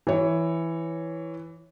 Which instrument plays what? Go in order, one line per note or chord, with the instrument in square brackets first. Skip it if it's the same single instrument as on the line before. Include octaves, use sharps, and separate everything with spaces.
[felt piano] E3 C#5